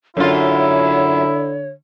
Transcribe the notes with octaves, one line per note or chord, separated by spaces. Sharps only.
F#2 D3 E4 F4 C#5